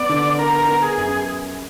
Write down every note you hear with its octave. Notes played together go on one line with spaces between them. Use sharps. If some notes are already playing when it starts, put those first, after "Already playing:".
Already playing: B3 D5
D3
B3 A#4
B3
G#4
F#2